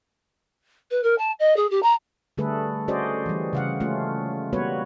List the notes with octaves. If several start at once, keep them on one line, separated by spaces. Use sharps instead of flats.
B4
A#4
A5
D#5
G#4
G4
A#5
D3 G3 A3 G#4 A4 B4
C#4 F#4 G#4 C5 D5 D#5
E3 G3
C#3 F5 F#5
G#3 A3 C#4 F4
G3 A#3 B3 F#4 B4 C#5